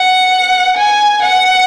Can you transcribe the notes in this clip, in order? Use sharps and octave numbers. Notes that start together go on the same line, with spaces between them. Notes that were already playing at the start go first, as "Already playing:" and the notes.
Already playing: F#5
G#5
F#5